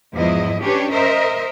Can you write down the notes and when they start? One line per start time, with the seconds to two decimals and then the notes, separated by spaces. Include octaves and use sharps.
0.13 E2 G#2 F3 E4 D#5
0.62 C#4 D4 G4 B4 C#5
0.92 A#4 C5 D#5 E5